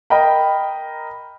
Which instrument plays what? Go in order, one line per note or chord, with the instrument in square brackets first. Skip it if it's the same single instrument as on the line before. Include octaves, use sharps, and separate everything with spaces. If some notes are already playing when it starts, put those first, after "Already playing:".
[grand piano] A#4 D#5 G5 A#5 B5